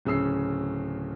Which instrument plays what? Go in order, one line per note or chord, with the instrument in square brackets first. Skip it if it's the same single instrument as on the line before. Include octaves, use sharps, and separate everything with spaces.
[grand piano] D1 C#3 C#4 E6 C7